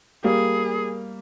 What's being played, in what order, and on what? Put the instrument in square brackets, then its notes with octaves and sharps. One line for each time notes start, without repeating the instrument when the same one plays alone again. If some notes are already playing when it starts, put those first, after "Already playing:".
[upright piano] G3 A#3 [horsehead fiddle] G#4